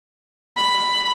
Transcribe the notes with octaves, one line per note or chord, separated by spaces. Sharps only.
B5